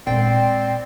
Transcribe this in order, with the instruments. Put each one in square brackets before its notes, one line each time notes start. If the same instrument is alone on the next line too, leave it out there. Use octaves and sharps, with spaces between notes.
[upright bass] A#2 G#3 [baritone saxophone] C4 [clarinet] D5 [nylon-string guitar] G5